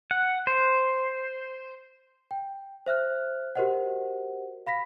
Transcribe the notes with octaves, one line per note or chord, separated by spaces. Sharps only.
F#5
C5
G5
C5 E5 F6 F#6
F#4 G4 A#4 C5 D#5 F#5
F5 B5 A#6 B6